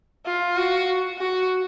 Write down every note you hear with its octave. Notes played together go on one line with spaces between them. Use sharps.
F4
F#4
F#4